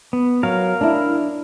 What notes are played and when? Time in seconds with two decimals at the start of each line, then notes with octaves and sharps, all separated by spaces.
0.13 B3
0.43 F#3 A#4 F5
0.81 D4 E4